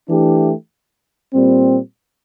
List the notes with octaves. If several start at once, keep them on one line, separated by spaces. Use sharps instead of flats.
E3 A3 D4 G4
A#2 G3 C4